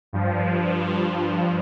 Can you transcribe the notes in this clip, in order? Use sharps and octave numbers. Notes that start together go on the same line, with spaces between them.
G2 F3